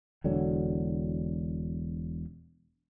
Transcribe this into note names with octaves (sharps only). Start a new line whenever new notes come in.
E1 D3 F#3